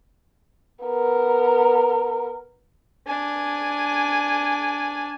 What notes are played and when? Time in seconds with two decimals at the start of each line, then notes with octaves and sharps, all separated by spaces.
0.84 B3 A#4
3.07 D4 G#5